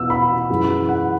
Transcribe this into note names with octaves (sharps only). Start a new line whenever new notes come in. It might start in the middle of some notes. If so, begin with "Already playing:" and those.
Already playing: E2 B2 B3 E6
B5
F#2 E3 G#3
F#5